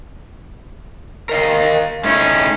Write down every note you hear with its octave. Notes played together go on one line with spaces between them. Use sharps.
A#4 D#5 F5
A3 C#4 D#4 E4